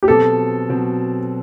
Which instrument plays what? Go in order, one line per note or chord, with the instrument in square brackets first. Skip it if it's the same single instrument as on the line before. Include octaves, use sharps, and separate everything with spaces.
[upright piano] G4
[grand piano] B2 F#3 C4 [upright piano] A4
[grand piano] B2 F#3 C4